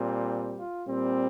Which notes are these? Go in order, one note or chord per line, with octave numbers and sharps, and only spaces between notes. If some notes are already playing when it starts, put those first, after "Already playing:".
Already playing: A#2 G3 C4
F4
A#2 G3 C4